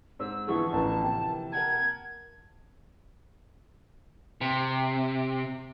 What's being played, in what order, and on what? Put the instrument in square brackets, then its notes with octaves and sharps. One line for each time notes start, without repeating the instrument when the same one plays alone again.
[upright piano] G#2 C4 [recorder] E6
[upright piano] D3 E3 F3 [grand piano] B3 E4 G#4 [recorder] C#6
[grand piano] A1 A#4 B4 [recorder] A5
[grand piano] C3 A#3 G5
[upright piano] A#4 F#5 A5 [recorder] G#6
[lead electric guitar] C3